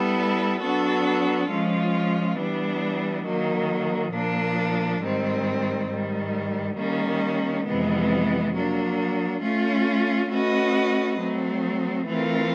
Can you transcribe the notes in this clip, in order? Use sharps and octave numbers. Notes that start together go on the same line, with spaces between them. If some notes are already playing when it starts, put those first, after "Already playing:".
Already playing: G3 B3 E4 A4
F#3 B3 D4 F#4 A4
F3 G#3 C#4 F4
E3 G3 B3 D4
D#3 F#3 A#3
A#2 F3 A#3 D4
G#2 D#3 G3 C4
G#2 D#3 G3
D#3 G3 A#3 C#4
F2 C3 E3 G#3 B3
F#3 A#3 D4
A3 C#4 F4
A3 C#4 F#4 B4 D#5
F#3 A3 C4
E3 A3 C4 F4 A#4